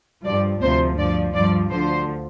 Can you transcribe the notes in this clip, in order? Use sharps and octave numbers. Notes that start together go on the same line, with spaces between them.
G2 F3 D5
D2 C3 F3 C5
G2 F3 D5
G2 F3 D5
D2 D3 F3 C5